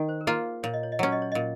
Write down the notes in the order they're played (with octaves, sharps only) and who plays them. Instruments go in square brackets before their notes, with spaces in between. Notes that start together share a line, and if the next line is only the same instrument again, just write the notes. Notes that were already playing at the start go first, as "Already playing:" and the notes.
Already playing: [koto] D#3
[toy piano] C5
A#4
[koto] A#3 F4 [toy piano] G#4
[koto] A#2 [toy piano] C#5
[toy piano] D#5
C#5
D#5
[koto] F#3 C#4 [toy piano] C#5
[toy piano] D#5
C#5
[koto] A#2 [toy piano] D#5